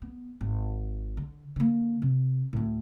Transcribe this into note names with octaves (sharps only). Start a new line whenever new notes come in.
B3
G#1
D3
D3 A#3
C3
D2 A2